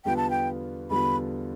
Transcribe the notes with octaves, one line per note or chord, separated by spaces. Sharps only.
E2 D3 G3 B3 F4 G5
A5
G5
E2 D3 G3 B3 F4 B5